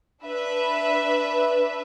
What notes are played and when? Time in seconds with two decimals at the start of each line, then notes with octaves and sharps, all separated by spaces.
0.23 D4 B4 E5